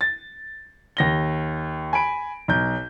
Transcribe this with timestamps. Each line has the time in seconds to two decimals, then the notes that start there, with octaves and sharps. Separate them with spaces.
0.01 A6
0.97 D#2 A#6 G7
1.93 G#5 B5 D7
2.48 B1 G6